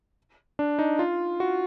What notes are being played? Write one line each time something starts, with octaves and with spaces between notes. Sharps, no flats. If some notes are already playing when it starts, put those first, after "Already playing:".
D4
D#4
F4
F#4